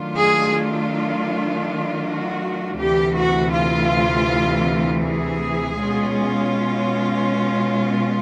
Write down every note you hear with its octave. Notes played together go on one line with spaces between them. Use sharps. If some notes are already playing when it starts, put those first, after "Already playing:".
Already playing: D#3 F#3 A3 D4 F4
G#4
F#4
D2 C3 E3 G4
F#4
F4
G#4
B2 G#3 C#4 F4